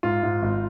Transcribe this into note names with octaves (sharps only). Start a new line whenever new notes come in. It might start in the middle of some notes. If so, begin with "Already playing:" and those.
G#2 F4
G#2
G#1